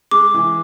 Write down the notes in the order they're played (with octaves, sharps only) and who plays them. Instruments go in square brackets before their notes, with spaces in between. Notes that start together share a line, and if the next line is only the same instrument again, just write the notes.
[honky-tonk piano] G#3 [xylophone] D6
[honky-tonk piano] E3